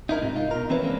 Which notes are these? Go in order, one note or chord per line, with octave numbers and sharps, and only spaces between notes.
D#4 E4 A#4
G#2 C3
D#4 F4
B2 A#4
E3 C4 C#4 E4 B4 C#5
E3 G#3 A#3 C4 D4